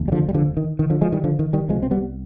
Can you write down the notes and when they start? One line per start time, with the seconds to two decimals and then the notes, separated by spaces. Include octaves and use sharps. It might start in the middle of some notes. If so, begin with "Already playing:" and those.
Already playing: F1 D#2
0.08 G3
0.12 D3 F3
0.29 G3
0.34 D3 F3
0.57 D#3
0.79 D#3
0.90 D3 F3
1.01 F3 G#3
1.12 D#3 G3
1.24 D3 F3
1.39 D#3
1.53 D#3 G3
1.69 C2 B2 F3 G#3
1.83 C4
1.91 G3 B3